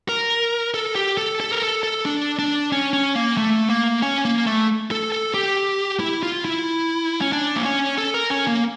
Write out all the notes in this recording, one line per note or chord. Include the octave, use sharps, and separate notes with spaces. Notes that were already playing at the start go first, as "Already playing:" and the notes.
A#4
A4
G4
A4
A4
A#4
A4
A4
D4
D4
C#4
C#4
A#3
A3
A#3
C#4
A#3
A3
A4
A4
G4
E4
F4
E4
C#4
D4
A#3
C#4
A4
A#4
C#4
A#3